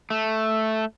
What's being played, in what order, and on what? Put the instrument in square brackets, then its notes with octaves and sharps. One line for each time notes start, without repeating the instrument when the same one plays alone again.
[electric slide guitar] A3